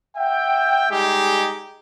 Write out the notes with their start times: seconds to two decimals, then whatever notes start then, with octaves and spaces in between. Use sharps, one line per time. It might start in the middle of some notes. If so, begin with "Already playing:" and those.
0.17 E5 F#5 G5
0.90 G3 G#3 D#4 G4 G#4